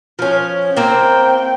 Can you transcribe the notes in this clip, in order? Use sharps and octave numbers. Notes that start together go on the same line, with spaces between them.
F3 C#4
A#3 C4 G5